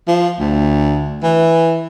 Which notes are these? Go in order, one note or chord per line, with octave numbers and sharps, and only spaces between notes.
F3
D2
E3